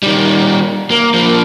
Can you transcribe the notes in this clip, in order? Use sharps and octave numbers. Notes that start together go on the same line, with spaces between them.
D#3 G3
A#3
F3 A#3